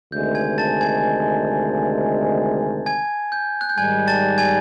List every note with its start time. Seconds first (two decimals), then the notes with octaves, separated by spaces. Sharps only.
0.12 D2 C3 D#3 G#3 G6
0.35 G#5 G#6
0.58 A5 A6
0.81 G#5 G#6
2.86 G#5 G#6
3.32 G6
3.61 F#6
3.69 G6
3.78 G#2 D#3 G3 G#5 G#6
4.08 A5 A6
4.38 G#5 G#6